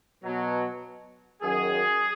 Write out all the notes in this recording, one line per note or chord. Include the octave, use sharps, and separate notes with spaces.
B2 F#3
F#2 D#3 F#3 G#4